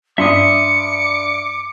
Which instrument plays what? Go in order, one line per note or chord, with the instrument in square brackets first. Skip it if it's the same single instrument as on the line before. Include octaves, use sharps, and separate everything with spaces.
[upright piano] G2 [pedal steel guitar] E5 C6 D#6 [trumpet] D6 [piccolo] C#7